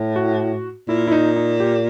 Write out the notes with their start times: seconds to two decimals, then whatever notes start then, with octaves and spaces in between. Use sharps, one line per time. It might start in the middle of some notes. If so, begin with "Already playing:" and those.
Already playing: A2
0.16 F#4
0.88 A#2 E4
1.07 E4
1.12 D#4
1.36 D#4
1.60 G4